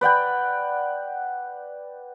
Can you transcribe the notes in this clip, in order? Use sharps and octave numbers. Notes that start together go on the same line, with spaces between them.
B4 D5 F#5 G5